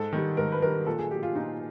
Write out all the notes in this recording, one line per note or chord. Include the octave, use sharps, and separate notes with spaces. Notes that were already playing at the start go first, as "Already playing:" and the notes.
Already playing: G#2 A4
D#3 G3
G#2 A#4
B4
D#3 G3 A#4
A#2 A4
G#4
F#3 G4
F4
A#2 D#4